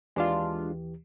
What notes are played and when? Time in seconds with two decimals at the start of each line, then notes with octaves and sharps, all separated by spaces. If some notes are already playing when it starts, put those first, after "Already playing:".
0.16 D#2 E3 G#3 D4 F4 G4